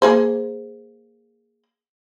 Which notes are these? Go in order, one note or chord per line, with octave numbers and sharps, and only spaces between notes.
A#3 G#4 C5